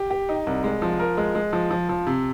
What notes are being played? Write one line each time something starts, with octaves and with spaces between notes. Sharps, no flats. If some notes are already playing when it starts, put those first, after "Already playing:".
Already playing: G4
G4
D#4
C2
G#3
F3
A#4
G#3
G#3
F3
F3
F3
C3